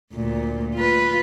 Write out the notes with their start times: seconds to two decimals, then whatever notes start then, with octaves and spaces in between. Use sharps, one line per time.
0.14 D2 A#2
0.75 F4 B4